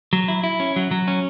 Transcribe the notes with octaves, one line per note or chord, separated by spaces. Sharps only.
F#3
E4
E4
C#4
F#3
F#3
C#4